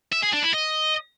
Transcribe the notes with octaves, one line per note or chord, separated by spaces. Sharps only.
E5
G#4
D4
E4
D#5